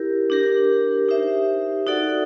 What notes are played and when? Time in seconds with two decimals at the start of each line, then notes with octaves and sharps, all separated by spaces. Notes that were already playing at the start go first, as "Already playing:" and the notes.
Already playing: E4 G4 A#4
0.30 D4 G4 A#4
1.09 D#4 G4 C5 E5
1.87 D#4 F#4 A4 D5 F#5